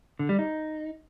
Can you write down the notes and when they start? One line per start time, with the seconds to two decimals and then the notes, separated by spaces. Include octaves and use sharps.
0.19 D3
0.29 G3
0.39 D#4